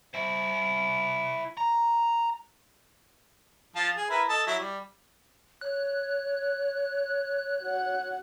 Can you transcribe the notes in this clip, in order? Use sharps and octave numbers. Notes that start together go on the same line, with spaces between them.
E4 C5
A#5
F3 F4 A5
G#4
E4 A#4 B4
A4 D#5 A5
F#3 E4
G3
C#5 F#6
F#4 F#5